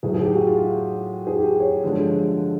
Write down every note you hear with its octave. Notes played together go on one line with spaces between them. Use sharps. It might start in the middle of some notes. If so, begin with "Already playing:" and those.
A2 F#3 G#4
G#4
G4
F#4
F4
G#4
G4
C#5
G2 D3 F3 G#3